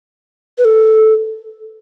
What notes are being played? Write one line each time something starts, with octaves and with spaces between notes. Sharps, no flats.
B4
A4